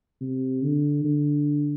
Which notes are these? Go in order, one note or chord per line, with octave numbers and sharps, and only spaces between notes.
C3
D3
D3